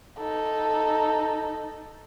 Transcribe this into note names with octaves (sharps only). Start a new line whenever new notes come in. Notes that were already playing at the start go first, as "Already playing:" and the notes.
D#4 A4